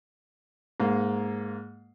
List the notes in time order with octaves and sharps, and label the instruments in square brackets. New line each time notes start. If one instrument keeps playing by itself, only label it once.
[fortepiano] G#2 A#3